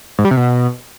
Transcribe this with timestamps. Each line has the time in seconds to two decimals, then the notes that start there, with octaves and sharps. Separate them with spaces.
0.19 G#2
0.25 G3
0.31 C3
0.37 B2